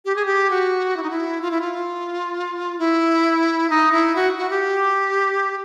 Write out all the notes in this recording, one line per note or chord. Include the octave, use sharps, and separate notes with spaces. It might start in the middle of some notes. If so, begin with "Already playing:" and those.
G4
G#4
G4
F#4
E4
D#4
E4
F4
E4
F4
E4
D#4
E4
F#4
F#4
G4